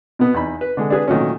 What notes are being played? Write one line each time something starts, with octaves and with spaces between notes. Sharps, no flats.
B2 B3
E2 D#4 B5
B4
D3 G#3
D4 G#4 B4
A#2 D#3 F#3 A3 C#4